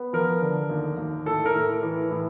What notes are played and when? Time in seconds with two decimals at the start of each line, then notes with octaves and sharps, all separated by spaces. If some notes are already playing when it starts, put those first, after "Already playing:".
Already playing: B3
0.13 F3 A#4
0.42 D3
0.70 D#2
0.98 D#2
1.26 A2 A4
1.46 A#4
1.55 A2
1.83 E3
2.11 A2